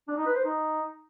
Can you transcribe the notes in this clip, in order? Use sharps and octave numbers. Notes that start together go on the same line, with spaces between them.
D4
D#4
B4
C5
D#4